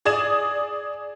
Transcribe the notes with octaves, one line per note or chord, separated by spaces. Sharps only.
G#4 D5 D#6 G#6 E7